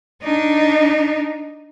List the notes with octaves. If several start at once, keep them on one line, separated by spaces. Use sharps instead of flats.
D4 D#4